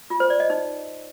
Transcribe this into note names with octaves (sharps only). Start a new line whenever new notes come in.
F4
C5
D5
D#5
D#4